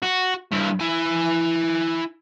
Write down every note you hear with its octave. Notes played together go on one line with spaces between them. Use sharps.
F#4
G2 E4
E4 G#5